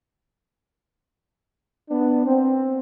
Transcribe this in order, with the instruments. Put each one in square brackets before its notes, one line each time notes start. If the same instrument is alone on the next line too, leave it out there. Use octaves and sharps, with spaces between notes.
[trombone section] B3 D4
C4